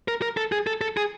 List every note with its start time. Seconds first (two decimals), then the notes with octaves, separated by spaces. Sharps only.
0.08 A#4
0.22 A#4
0.37 A4
0.52 G#4
0.67 A4
0.81 A4
0.97 G#4